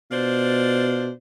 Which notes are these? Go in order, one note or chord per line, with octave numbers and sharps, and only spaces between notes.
B2 D4 F4 C5